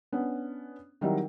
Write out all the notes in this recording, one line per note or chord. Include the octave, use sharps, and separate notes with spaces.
B3 C#4 D4
D#3 F#3 G3 C4 D#4 E4